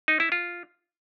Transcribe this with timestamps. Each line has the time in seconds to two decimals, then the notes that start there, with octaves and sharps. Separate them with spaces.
0.08 D#4
0.20 E4
0.32 F4